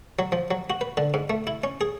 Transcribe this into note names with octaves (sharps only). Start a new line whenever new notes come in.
F#3
F3
F#3
F#4
B4
D3
G#2
A3
E4
C#4
G#4